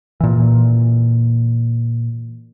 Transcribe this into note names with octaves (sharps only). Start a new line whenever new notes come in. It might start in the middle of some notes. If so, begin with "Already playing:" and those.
A#2 E3